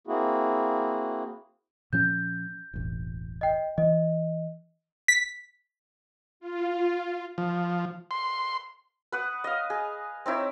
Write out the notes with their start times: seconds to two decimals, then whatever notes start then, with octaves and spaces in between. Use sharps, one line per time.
0.07 A#3 C4 E4 F#4 G#4
1.93 A#2 F3 C#4 G6
2.74 E1 A1
3.41 D#5 G5
3.78 E3 D#5
5.08 B6
6.40 F4
7.38 F3
8.11 C6
9.12 B4 F#5 D#6
9.44 D#5 F5
9.70 G#4
10.26 C4 D#4 E4 C#5